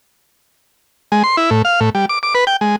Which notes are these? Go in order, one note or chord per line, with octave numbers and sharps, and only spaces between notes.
G#3
C6
E4
A2
F5
A2
G3
D6
D6
B4
G5
G#3